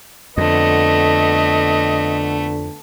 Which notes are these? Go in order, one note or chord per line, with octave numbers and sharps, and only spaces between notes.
F2 D3 A3 B3 D#5